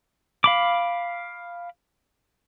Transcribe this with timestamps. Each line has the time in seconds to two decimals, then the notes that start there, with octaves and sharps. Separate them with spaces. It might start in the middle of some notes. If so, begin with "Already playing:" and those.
0.44 F5 B5 D6